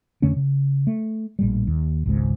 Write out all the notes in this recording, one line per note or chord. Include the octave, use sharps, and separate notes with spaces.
F2 D3 A3 C#4
C#3
A3
A#1 A2 G3
D#2
G#1 C#2 G#2